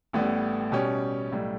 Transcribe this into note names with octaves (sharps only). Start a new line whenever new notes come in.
A1 A2 G3 B3
B2 G3 C#4 G4
B1 A2 G3